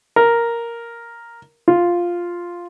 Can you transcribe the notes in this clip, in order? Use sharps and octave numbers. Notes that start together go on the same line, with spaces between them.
A#4
F4